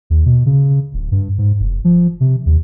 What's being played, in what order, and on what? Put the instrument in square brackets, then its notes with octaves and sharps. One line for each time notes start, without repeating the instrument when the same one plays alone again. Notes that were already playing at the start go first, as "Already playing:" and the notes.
[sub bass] D#2
B2
C#3
D1
G2
G#2
F1
F3
C3
D#2